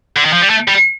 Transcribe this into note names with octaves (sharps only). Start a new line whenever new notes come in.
D3
D#3
F3
G3
A3
G3